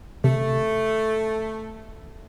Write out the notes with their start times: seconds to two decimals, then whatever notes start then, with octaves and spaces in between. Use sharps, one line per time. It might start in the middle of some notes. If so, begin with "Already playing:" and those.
0.24 C3 A3